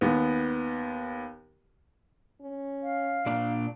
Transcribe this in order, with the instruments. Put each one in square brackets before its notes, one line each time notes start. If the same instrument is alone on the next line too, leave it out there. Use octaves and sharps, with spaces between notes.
[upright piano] D#2 B3
[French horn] C#4
[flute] F5
[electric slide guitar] A#2 D4 D5